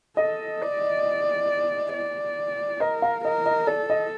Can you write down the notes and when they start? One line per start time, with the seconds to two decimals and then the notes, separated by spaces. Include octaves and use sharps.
0.17 A4 D#5
0.62 D5
1.93 D5
2.80 A#4 D#5
3.02 F5
3.24 A#4 D#5
3.46 D#5
3.67 A4 D5
3.90 D#5